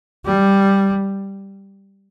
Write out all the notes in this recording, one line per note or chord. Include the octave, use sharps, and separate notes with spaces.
G3